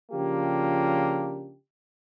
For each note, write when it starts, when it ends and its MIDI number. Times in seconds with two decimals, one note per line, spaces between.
0.12 1.53 49
0.12 1.53 53
0.12 1.53 58
0.12 1.53 62
0.12 1.53 65
0.12 1.53 67